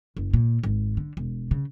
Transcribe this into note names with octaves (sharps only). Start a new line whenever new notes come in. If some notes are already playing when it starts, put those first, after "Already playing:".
F#1
A#2
G#1
D3
E1
C#3